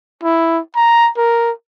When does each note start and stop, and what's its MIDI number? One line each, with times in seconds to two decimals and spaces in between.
0.24 0.60 64
0.75 1.10 82
1.17 1.51 70